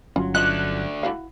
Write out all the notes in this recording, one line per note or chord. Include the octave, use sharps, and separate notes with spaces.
G1 F#3 C#4 F4
A3 D4 F4 D#5 F#6
E4 F#4 F5